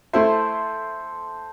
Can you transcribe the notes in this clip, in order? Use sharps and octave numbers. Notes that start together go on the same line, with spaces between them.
A3 E4 A4 C5 E5 C6